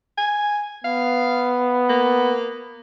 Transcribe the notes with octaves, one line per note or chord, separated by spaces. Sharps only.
G#5
B3 F5
A#3